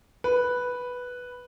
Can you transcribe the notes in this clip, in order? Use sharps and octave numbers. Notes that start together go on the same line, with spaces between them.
B4